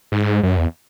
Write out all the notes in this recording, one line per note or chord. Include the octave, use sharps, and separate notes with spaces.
G#2
F#2
E2